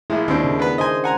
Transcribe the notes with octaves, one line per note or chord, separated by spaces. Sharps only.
A#1 F3 G#3 E4
D#2 D#3 C4 D4
C#3
B3 B4
C5 D#5 G#5
F#5 G#5 A#5